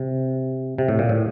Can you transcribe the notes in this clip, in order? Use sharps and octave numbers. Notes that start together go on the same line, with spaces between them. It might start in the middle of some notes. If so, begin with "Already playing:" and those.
Already playing: C3
C3
A2
A#2
A2